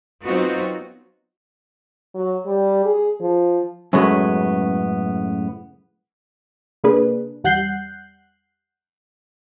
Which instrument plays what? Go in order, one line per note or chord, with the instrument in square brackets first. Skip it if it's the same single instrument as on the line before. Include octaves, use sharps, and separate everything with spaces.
[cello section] F#3 B3 C4 D#4 F4 F#4
[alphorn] F#3
G3
G#4
F3
[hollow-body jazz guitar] F#2 A2 C#3 G#3 A3 B3
[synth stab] C3 A#3 D4 G#4 B4
E2 G3 F#5 F#6 G6 C7